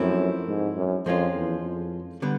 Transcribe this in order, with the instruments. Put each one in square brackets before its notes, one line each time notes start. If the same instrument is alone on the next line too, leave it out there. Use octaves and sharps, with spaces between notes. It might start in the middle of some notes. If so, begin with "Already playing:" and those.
Already playing: [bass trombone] F#2 [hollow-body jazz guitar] F3 A3 C4 E4
[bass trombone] G#2
F#2
[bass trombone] F2 [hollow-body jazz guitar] F3 G#3 C#4 F4
[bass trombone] E2
F2
[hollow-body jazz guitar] D3 G3 B3